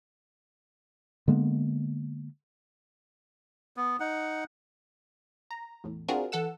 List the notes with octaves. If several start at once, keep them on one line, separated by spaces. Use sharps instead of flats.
D3 G#3 A#3 B3
B3
D#4 F#5
A#5
E2 A2
C4 D4 F4 F#4 G#4 A#4
E3 A4 F#5 E6